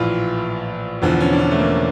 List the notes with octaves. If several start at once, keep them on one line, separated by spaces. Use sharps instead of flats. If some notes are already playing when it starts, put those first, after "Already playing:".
Already playing: A#1 A2 E3 F4
E1 E2 D3 F3
C#4
D4
C#4
A3
A#3